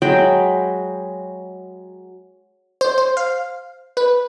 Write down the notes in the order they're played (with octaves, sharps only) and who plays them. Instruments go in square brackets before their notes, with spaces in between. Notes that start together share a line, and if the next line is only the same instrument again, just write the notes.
[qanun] F#3 G#3 G5 B5
[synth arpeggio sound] C5
C5
F5
B4